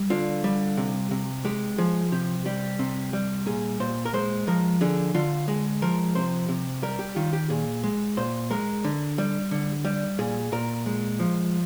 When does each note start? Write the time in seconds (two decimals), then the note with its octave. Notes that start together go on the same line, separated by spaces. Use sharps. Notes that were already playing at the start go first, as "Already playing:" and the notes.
Already playing: G3
0.10 D3 F4
0.44 G3
0.77 C3
1.11 C3
1.45 G#3 G4
1.78 F3 G#4
2.12 C3 G4
2.46 G3 G4
2.79 C3
3.13 G3
3.46 A#2 G#4
3.80 A#2 C5
4.05 A#4
4.13 G#3 C5
4.47 F3 A#4
4.81 D3 G#4
5.14 D3 F4
5.48 G#3 G#4
5.82 F3 A#4
6.15 C3 C5
6.49 C3
6.83 G3 A#4
6.99 G4
7.16 D#3 F4
7.33 G4
7.50 A#2 G#4
7.84 G#3
8.17 A#2 C5
8.51 G#3 A#4
8.84 D3
9.18 G3
9.51 D3
9.85 G3
10.18 A#2 G#4
10.52 A#2 A#4
10.86 G#3
11.20 F3